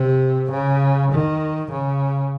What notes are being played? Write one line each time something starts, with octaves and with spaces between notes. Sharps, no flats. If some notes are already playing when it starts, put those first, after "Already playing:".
Already playing: C3
C#3
D#3
C#3